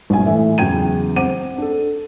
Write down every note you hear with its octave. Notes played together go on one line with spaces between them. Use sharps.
A#1 G2 G#5
A2 E3 E5
E2 C#3 F#3 G5 G#6 D#7
C4 C5 F#5 D6 D#7
D4 A4